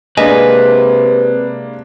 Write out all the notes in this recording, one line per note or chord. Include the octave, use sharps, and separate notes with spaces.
C3 G#3 A#3 D4 B4 D#5 G#5